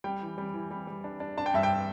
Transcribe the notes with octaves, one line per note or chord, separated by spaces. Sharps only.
G3 G5
E3
G3
E3
G3
G3
D4
D4
D4 A5
G5
G2 E5
G5